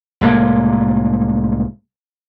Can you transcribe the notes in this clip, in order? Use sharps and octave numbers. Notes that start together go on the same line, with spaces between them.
C2 A2 G#3 A#3